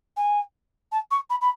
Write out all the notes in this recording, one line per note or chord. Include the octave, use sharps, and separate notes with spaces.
G#5
A5
C#6
B5
B5